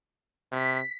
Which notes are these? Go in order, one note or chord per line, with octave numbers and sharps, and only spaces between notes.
C3 B6